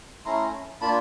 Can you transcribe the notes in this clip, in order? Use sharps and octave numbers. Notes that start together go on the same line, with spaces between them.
A3 C#4 E4 A#5 C6
A#3 D4 F4 A5 B5